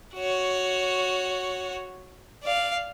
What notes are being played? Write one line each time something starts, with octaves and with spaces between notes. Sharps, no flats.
F#4 C#5
D5 F5